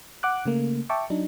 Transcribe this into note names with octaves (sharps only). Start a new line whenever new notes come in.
F#5 D6 F#6
C#3 A3 A#3
E5 G5 A5 C#6 D6
F#3 D4 D#4